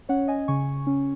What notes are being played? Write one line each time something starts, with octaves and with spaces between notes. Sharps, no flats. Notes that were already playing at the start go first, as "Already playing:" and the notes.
C#4 C#5 F#5
D#5 G#5
C#3 G#5 C#6
C#4